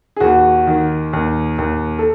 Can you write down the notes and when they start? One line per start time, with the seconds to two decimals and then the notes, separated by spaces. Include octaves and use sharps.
0.17 G#4
0.20 D#2 F#4
0.67 D#3
1.13 D#2
1.58 D#2
1.99 A4